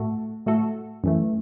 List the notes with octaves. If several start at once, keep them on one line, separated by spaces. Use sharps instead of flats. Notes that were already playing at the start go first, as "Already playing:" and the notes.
Already playing: A2 A3 F#4 A4
A2 A3 F#4 A4
F#2 E3 A3